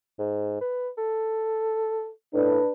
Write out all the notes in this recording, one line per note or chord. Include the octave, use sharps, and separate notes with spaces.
G#2
B4
A4
A2 D4 B4